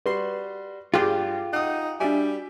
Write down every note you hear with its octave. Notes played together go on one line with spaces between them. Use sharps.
G3 F#4 B4 C6 C7
G2 F4 G4 G#4 G5 F#6
D#4 F#5 D#6
G3 D4 F#4 E5 G#5